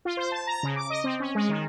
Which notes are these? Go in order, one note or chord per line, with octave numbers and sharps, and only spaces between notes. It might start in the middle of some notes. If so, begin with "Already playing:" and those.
F4
C5
A5
A#5
C#3
D6
D#5
C4
C#4
G#3
D#3